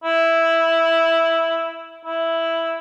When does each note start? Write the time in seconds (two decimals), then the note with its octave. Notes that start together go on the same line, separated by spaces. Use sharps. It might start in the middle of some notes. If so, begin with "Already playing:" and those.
0.04 E4
2.05 E4